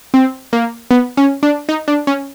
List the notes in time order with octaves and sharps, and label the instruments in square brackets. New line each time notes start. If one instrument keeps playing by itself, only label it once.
[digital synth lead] C4
A#3
B3
C#4
D4
D#4
D4
C#4